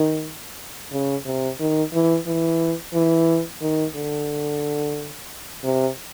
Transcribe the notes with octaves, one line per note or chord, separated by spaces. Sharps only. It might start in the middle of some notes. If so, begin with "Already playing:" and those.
Already playing: D#3
C#3
C3
D#3
E3
E3
E3
D#3
D3
C3